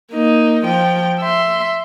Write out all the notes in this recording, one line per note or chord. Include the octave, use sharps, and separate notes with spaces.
A#3 D#4
F3 G5
E5 C6